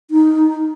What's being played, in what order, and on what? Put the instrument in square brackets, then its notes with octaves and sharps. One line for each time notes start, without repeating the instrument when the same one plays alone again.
[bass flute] D#4